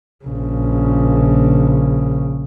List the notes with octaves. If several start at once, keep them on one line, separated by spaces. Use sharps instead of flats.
A#1 C#3